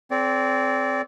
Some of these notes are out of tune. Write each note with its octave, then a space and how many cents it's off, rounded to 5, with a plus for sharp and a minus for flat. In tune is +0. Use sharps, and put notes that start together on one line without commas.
C4 +0 A4 -35 D5 -30